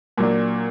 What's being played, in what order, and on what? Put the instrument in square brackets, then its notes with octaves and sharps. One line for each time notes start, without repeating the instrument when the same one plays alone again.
[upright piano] A#2 F#3 A#3 D4